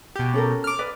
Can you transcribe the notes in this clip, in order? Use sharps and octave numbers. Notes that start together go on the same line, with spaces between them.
B2 G4
C#4 A4 A#4
D6 F6
B4 D5 D#5